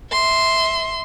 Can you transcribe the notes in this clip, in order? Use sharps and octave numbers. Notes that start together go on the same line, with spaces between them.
E5 C6